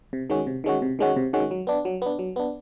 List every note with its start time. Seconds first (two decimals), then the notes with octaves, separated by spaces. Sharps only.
0.13 C3
0.30 D#3 G#3 C#4 F#4
0.47 C3
0.64 D#3 G#3 C#4 F#4
0.82 C3
0.99 D#3 G#3 C#4 F#4
1.16 C3
1.33 D#3 G#3 C#4 F#4
1.51 F#3
1.67 B3 D4
1.85 F#3
2.02 B3 D4
2.19 F#3
2.36 B3 D4